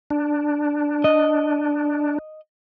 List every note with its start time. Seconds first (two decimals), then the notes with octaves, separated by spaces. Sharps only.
0.10 D4
1.04 D#5